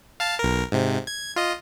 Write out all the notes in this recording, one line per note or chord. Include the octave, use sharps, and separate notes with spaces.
F5 A5 A6
B1 A#4
G#2 C3
G#6
F4 D#5